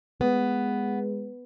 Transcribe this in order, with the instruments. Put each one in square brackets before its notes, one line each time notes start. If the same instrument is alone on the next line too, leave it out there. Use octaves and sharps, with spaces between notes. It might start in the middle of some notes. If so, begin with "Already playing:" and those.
[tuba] G#3 [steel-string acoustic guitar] B3